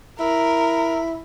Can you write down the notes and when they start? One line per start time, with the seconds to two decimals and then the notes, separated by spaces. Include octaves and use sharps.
0.20 E4 A#4